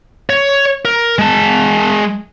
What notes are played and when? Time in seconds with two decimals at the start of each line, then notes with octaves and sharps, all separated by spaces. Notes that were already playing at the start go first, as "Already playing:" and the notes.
0.30 C#5
0.85 A#4
1.19 G#3 A5